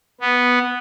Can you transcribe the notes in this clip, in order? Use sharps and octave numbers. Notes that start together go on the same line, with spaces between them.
B3